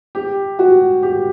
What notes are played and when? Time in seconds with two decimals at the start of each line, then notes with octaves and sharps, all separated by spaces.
0.15 G4
0.59 F#4
1.03 G4